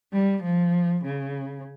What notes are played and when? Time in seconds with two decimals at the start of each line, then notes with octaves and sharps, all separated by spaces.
0.13 G3
0.43 F3
1.04 C#3